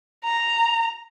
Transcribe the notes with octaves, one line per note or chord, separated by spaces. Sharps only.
A#5